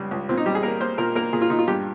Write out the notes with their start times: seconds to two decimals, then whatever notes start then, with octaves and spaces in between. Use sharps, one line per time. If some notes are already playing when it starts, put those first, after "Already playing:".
Already playing: C#2 C#3 G3
0.11 C#2
0.29 A#2 C4
0.37 D#4
0.46 G3 G4
0.55 G#4
0.63 A#3 A#4
0.80 A#3 C5
0.98 A#2 A#4
1.15 A#3 A#4
1.33 A#2 G#4
1.41 F4
1.50 A#2 D#4
1.59 F4
1.68 G2 G4